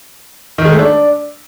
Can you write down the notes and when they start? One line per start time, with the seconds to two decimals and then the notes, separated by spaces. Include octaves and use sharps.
0.58 D#3
0.65 G#3
0.72 A3
0.79 D4